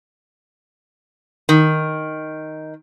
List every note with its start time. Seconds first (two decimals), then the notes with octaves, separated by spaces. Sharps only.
1.49 D#3